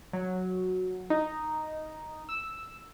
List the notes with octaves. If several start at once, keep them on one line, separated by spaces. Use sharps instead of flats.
F#3
D#4
E6